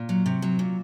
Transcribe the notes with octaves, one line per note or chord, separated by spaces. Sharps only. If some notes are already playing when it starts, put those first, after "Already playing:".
Already playing: A#2
F#3
C3
F#3
A#2